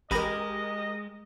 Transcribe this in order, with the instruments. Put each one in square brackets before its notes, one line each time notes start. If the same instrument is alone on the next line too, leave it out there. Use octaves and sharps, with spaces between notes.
[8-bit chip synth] A1 B5 A#6 [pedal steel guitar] G#3 [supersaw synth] G4 A#4 [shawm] D#5